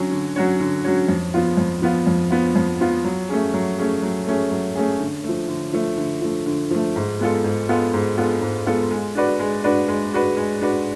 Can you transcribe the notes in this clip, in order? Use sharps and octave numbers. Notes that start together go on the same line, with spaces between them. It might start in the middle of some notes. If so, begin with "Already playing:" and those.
Already playing: D3 F#3 C#4 F#4 C#5
D3
F#3 C#4 F#4 C#5
D3
F#3 C#4 F#4 C#5
F2
F3 B3 F4
F2
F3 B3 F4
F2
F3 B3 F4
F2
F3 B3 F4
F#3
A3 C#4 G#4
F#3
A3 C#4 G#4
F#3
A3 C#4 G#4
F#3
A3 C#4 G#4
D3
F3 A3
D3
F3 A3
D3
F3 A3
D3
F3 A3
G#2
G#3 B3 F4 A4
G#2
G#3 B3 F4 A4
G#2
G#3 B3 F4 A4
G#2
G#3 B3 F4 A4
G#3
D4 F#4 B4 D5
G#3
D4 F#4 B4 D5
G#3
D4 F#4 B4 D5
G#3
D4 F#4 B4 D5